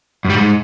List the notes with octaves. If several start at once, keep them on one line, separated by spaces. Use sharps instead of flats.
F#2
G3
G#2